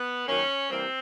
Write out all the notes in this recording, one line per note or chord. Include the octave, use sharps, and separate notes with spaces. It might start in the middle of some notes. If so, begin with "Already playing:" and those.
Already playing: B3
F#2 D#3 F#3 A#3 C#4
C3 E3 G3 A#3 C4